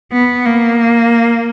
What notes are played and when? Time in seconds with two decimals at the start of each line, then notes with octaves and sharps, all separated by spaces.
0.13 B3
0.45 A#3